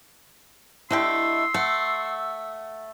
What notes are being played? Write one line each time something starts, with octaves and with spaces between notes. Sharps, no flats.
D3 A3 E4 G4 D#5 C6 E6
A3 F#5